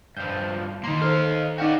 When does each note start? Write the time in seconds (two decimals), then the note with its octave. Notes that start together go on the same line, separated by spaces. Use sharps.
0.17 G2 F3 G6
0.84 D#3 A#3 D#4 C6
1.01 D#4 A4 C5 F5
1.58 D#4 F#4 D5 F5 G5